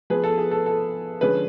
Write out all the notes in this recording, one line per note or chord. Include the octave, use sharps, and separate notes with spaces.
F3 B3 G#4 B4
A4
G#4
A4
A4
D3 F3 G#3 C#4 G#4 B4